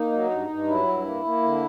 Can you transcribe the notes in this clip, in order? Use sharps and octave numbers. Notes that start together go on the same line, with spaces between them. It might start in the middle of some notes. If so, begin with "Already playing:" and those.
Already playing: A#3 D#4
F#3
G2
G2
F#3 E4
G2
A#3
A#3
D3